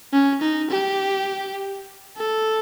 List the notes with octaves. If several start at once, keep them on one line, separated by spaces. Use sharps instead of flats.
C#4
D#4
G4
A4